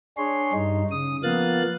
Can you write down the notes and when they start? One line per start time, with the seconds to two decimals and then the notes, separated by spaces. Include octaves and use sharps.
0.17 D4 G#4 C#5 C6
0.53 G2 D#4
0.91 C#3 D#6
1.23 F3 A#3 B3 F5 F#6 A6